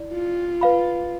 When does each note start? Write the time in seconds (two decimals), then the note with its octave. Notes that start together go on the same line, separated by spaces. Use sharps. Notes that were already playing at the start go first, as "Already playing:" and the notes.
Already playing: E4 D5
0.13 F4
0.61 B4 F5 B5